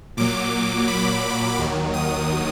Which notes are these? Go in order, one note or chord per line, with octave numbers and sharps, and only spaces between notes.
A#2 F#3 D6
B5
D#2 D#3 F#3
D#6